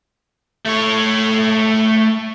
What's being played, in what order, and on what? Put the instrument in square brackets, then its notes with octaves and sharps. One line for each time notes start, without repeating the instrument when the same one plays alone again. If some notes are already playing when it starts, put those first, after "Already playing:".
[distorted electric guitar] A3 C#5